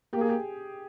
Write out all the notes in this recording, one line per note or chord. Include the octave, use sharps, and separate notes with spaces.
A#3 G4
G#4
G4